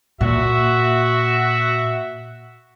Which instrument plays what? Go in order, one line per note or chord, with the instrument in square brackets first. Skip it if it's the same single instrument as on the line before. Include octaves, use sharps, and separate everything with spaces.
[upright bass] A#2 [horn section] F#4 E5